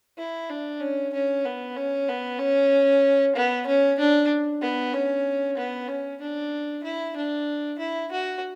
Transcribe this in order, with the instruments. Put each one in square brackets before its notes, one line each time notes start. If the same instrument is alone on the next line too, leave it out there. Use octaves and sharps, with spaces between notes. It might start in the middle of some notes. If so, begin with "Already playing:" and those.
[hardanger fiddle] E4
D4
C#4
C#4
B3
C#4
B3
C#4
B3
C#4
D4
B3
C#4
B3
C#4
D4
E4
D4
E4
F#4